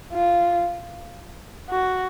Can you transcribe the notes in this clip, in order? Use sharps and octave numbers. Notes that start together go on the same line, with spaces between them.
F4
F#4